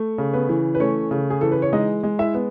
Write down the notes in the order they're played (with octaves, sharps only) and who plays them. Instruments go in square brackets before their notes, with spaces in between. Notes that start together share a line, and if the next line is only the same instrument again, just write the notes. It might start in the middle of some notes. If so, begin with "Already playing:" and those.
Already playing: [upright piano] A3
C#3
B3 B4
E3
B4
A3 C#4 C#5
C#3
G#4
E3 A4
B4
C#5
G#3 D#4 D#5
G#3
E4 E5
B3